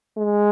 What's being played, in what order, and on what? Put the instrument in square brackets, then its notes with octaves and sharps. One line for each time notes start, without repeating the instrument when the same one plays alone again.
[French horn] G#3